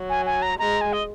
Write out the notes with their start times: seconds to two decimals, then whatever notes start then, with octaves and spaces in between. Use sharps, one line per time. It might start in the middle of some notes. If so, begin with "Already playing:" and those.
Already playing: F#3
0.10 G#5
0.26 G#5
0.42 A#5
0.59 G#3 A#5
0.81 G#5
0.93 D#5